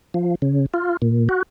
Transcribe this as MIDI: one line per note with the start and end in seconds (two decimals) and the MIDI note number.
0.14 0.35 53
0.42 0.66 49
0.74 0.97 65
1.02 1.28 46
1.29 1.43 66